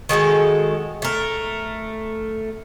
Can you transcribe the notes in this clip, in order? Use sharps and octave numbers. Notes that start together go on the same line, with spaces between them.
D#3 G#3 F#4 A4
A3 A#4